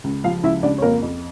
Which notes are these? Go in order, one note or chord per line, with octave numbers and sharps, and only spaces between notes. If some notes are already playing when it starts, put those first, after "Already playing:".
C#2
F3 F4 F5
C#2 E4 E5
C#2 D4 D5
C#5
F2 A#3 A#4
F2